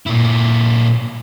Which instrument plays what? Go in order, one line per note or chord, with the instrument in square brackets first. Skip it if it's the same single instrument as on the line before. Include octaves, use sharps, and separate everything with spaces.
[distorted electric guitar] A#2 E4